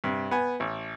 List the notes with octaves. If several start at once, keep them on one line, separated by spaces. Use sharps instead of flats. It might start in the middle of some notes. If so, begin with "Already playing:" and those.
G2 C3
B3 G#5
A1